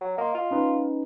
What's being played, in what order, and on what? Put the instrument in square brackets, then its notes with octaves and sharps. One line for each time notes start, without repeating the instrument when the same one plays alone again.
[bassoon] F#3
[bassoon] A#3 [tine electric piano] D#5 C6
[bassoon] F4
[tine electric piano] C#4 D#4 B4